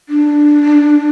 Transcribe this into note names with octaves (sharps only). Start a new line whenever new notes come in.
D4